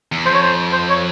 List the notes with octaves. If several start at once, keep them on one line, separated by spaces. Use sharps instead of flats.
E2
F2 C5
C#5
C5
C5
C#5